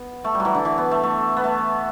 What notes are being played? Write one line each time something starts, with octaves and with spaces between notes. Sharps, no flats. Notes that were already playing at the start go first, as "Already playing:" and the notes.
Already playing: B3
A3
G3
F#3
E3
D3
E3
B3
A3
A3
B3
A3